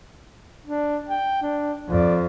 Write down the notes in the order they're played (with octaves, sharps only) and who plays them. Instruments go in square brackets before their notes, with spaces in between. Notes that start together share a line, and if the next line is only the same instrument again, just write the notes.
[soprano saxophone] D4
G5
D4
[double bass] F2 [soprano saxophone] D5